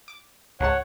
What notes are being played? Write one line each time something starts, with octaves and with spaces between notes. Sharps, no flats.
D6
C#2 G#2 C#5 F#5 A5